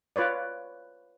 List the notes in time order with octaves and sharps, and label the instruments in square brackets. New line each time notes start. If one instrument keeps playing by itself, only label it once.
[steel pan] F4 B4 C#5 D5